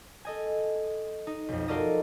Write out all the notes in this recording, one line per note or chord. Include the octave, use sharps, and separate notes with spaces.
A4 D#5 G#5
D#4
B1 F2
F4 F#4 A4 A#4 D5 D#5